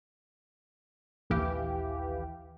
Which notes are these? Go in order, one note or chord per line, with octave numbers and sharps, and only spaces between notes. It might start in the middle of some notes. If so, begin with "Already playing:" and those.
A#1 D#2 E3 G4 F5